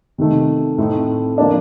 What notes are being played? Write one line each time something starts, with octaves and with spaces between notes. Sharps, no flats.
C3 D#3 A3
A2 A3 C4 D#4
F3 A#3 D4